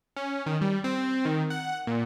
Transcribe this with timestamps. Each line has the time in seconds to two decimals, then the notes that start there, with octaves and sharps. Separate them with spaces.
0.16 C#4
0.46 D#3
0.61 G3
0.84 C4
1.25 D#3
1.50 F#5
1.87 A#2